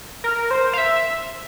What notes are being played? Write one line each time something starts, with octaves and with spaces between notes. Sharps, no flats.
A#4
C5
F5
E5